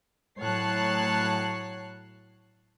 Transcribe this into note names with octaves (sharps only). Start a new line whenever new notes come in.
A2 F#3 C#5 A5 F#6 C7